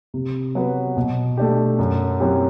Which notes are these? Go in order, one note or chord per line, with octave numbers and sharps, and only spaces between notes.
C3
F#3 B3 F#4 B4
B2
A3 D4 G4
F#2
F#3 C4 E4 G4